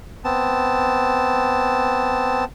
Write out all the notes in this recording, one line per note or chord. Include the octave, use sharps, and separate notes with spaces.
B3 C4 A5